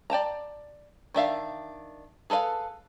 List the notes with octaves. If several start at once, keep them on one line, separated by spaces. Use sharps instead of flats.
D5 G5 A5 A#5
D#3 D4 E5 F5
G#4 A4 B4 E5 F5